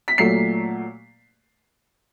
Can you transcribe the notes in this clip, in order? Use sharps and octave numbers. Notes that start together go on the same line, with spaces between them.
B6
A#2 F#3 A3 C7